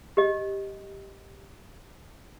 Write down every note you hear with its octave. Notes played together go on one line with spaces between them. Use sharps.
G4 D#5